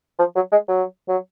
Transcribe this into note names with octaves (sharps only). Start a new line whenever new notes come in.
F3
F#3
G#3
F#3
F#3